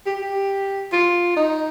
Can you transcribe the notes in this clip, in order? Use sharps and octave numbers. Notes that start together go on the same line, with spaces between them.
G4
G4
F4
D#4